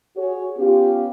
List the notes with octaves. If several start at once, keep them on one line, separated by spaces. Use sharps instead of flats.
F#4 G#4 C#5
B3 C#4 F4 G4